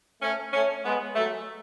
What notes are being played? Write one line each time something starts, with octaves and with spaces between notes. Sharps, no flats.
A3 C#4
A3 C#4
G#3 B3
F#3 A3